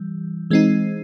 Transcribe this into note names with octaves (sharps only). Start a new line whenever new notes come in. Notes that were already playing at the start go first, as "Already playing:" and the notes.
Already playing: E3 G3
E3 G#3 C4 D#4